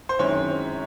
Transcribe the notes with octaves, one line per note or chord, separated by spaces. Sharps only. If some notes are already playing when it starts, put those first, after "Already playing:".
C5
F#2 D#3 G#3 C4 E4 C#5